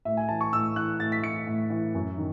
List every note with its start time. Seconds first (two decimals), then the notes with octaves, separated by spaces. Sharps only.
0.05 A2 E5
0.17 G#5
0.29 E3 A5
0.41 C#6
0.53 A2 E6
0.76 E3 F#6
1.00 A2 A6
1.12 B6
1.23 E3 C#7
1.47 A2
1.70 E3
1.94 F#2
2.18 D#3